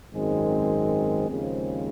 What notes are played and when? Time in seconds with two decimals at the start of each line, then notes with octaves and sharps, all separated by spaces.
0.13 G#1 F#2 D#3 G#3 C4
1.28 D#2 C#3 F3 G#3 C4